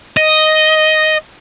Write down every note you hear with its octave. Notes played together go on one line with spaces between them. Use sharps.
D#5